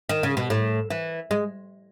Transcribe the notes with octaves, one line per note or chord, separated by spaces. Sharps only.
D#3
C#3
B2
A2
E3
G#3